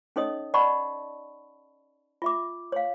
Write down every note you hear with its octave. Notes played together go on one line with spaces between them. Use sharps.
C#4 D#4 A4 C#5 D#5 D#6
D5 D#5 F#5 A5 B5 C#6
F4 E5 D6
C#5 F5